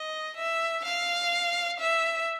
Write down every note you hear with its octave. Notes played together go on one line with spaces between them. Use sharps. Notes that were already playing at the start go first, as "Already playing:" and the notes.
Already playing: D#5
E5
F5
E5